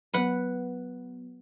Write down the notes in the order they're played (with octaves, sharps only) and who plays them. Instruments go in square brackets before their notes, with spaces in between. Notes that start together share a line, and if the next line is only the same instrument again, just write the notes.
[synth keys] F#3 B3 [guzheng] B4 F#5